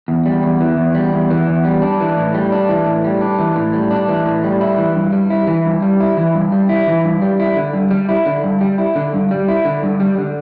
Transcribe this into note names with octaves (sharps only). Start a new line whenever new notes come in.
E2
G3
E2
E3
E2
G3
E2
E3
E2
G3
D4
E3
A2
G3
D4
E3
A2
G3
D4
E3
A2
G3
D4
E3
A2
G3
E4
E3
G2
G3
E4
E3
G2
G3
E4
E3
G2
G3
E4
E3
G2
G3
E4
D3
G2
G3
E4
D3
G2
G3
E4
D3
G2
G3
E4
D3
G2
G3
D3